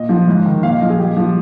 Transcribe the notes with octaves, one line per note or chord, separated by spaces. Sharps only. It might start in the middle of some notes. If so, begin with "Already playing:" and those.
Already playing: A#2 D#5
F3
G#2
D#3
A#2 F5
F5
F3 D#5
G#4
A#2 G4
F3